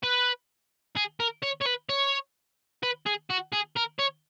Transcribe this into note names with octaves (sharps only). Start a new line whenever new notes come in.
B4
G#4
A#4
C#5
C#5
B4
C#5
B4
G#4
F#4
G#4
A#4
C#5